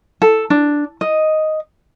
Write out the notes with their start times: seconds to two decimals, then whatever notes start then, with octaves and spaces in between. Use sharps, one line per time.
0.22 A4
0.50 D4
1.01 D#5